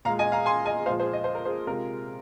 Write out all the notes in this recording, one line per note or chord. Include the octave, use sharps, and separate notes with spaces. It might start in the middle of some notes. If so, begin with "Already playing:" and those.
A#2 G#3 F5 A#5
D#5 G#5
F5 A#5
G#5 C6
D#5 G#5
A#2 F3 G#3 C5 F5
G#4 C5
D#5
C5
A#4
G#4 C5
C3 G#3 F4 A#4